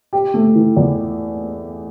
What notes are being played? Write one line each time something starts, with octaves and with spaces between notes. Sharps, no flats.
G4
A3
E3
E2